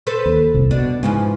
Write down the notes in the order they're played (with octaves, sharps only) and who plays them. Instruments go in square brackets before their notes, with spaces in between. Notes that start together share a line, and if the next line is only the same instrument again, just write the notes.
[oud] A4 B4 C5
[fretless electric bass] D#2
F1 C2
[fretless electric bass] B2 [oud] D4
[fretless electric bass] G#2 [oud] C#3 E3 F3